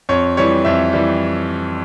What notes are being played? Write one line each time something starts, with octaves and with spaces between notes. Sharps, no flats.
F2 C#5
E3 G3 C#5
F2 E5
E3 G3